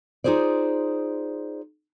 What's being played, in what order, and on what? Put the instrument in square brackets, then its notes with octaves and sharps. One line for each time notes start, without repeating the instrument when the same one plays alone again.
[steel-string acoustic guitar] D#4 F4 G#4 C5 D5